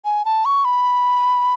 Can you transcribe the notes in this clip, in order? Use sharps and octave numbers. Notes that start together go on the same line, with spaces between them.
G#5
A5
C#6
B5